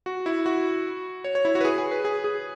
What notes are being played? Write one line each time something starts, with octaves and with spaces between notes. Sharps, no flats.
F#4
E4
F#4
C#5
C#5
E4
F#4
B4
G#4
G#4
B4
G#4
G#4